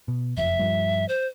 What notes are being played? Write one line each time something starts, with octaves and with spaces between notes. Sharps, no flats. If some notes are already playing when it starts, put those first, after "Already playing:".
B2
F#1 F2 E5
G2 F3 G3
C5